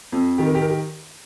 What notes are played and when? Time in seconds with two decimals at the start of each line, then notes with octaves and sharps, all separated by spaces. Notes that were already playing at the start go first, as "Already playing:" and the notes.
0.12 F2
0.38 D#3 G4
0.47 A#4
0.55 G4
0.62 A#4
0.69 G4